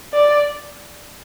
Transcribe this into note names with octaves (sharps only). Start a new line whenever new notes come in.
D5